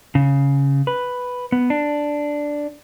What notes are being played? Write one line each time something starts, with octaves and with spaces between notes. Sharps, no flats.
C#3
B4
B3
D4